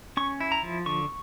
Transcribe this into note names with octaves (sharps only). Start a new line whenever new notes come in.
C#4 C#6
E4
A#5
F3
D3 C#6